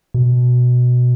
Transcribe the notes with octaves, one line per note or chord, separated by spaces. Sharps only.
B2